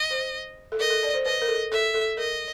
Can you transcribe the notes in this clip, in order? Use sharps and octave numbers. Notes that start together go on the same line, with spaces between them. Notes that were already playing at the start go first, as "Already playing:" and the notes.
Already playing: D#5
C5
A4
A#4 D#5
A4
D5
C5
B4 D#5
A#4
A4
A4 E5
A4
A#4 D#5